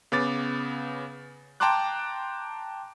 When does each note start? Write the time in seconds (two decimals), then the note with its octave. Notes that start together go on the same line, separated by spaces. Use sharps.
0.12 C#3 B3 D6 A6
1.60 G5 A5 A#5 C6 D6 F#6